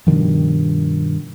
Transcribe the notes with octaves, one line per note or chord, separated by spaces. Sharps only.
G2 B2 D#3 F3